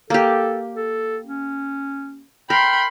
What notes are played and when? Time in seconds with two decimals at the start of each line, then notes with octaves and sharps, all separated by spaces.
0.10 A#3 G4 A4
0.76 A4
1.27 C#4
2.50 A#4 G5 B5 C6